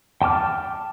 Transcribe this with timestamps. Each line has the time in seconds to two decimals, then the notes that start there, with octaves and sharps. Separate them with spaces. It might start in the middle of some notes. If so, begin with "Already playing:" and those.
0.22 G5 A5 D6 F6